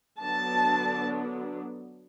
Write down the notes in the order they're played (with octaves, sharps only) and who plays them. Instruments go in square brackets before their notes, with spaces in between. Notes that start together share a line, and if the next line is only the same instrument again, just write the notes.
[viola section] D3 F#3 B3 D4 A5